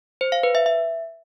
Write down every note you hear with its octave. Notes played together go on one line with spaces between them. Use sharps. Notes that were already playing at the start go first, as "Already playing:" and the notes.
C5
F5
B4
E5
E5